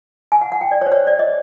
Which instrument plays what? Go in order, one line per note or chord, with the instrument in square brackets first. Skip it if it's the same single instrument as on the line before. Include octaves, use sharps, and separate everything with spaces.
[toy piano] G#5
F#5
F#5
G5
D5
C#5
C5
C#5
D5
D#5